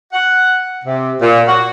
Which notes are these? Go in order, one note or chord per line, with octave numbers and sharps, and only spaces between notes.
F#5
C3
A#2
F#4